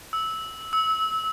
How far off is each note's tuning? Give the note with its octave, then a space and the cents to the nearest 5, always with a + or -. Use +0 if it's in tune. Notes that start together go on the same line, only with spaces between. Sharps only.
E6 -15
E6 -25